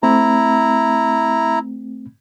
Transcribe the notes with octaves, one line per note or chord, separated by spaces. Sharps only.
A3 C4 E4 A#5